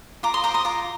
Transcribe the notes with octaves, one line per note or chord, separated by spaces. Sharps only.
F4 A#5 D6
C6 D#6
C5 A#5 D6
C6 D#6
F4 A#5 D6